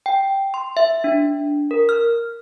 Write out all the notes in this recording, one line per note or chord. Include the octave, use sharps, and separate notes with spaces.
G5
C6
E5
D4
A#4
F6